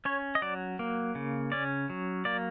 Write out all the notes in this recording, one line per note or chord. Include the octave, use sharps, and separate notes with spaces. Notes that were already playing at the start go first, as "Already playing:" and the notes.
C#4 C#5
D#5
F#3 D5
A#3
C#3
C#4 D5
F#3
A#3 D5